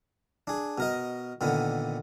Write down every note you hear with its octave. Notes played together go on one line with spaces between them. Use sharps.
D4 G#4
B2 A#4 D#5
A#2 D3 D#3 B3